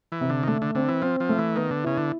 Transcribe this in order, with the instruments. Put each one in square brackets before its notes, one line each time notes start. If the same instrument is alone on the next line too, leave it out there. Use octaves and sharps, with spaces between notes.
[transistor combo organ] E3
[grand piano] C3
[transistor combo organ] D3
D#3
[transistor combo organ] D3 [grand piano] A3
[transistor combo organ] D3
[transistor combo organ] D3 [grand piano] C4
[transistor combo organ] E3
[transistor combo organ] F3 [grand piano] C4
[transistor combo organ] F3
[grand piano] A3
[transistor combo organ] E3
[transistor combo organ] D#3 [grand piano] B3
[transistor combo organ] D3
[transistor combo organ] C#3 [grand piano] E4
[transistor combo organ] D3